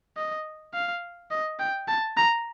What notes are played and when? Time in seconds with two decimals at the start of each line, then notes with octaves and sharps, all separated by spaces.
0.17 D#5
0.74 F5
1.31 D#5
1.59 G5
1.88 A5
2.17 A#5